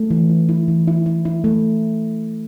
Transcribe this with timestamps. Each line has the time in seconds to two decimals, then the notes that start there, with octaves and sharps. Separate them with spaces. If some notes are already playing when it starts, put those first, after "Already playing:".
Already playing: A3
0.10 E3
0.30 E4
0.49 E4
0.68 E3
0.88 E4
1.06 E4
1.25 E4
1.44 A3